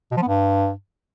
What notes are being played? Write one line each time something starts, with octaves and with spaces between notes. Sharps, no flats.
B2
F3
B3
G2